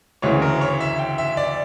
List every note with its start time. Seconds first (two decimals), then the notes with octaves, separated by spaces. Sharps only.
0.22 D2 C#3 E3 C#5
0.42 A#4
0.61 C#5
0.80 E5
0.99 G5
1.18 E5
1.37 D5